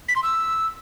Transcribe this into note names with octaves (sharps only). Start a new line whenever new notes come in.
B6
C6
E6